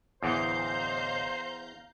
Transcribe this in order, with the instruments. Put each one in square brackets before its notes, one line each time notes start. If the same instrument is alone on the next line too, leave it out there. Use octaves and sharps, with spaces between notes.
[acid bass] D1 [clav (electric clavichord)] E2 E3 [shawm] C5 [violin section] F5 A#5 G6